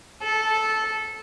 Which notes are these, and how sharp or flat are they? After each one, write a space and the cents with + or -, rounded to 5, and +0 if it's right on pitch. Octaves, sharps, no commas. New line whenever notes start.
A4 -10